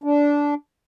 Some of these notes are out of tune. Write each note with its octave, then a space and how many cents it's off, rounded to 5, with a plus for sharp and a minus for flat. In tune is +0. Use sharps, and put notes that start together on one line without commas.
D4 -15